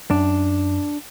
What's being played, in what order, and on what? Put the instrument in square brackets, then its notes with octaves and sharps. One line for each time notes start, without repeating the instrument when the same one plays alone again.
[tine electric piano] F#2 [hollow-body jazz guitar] D4